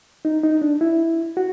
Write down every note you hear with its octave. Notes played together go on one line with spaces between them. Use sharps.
D#4
D#4
D4
E4
F#4